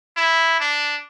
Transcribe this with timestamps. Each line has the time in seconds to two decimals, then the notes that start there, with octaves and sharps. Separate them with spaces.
0.17 E4
0.60 D4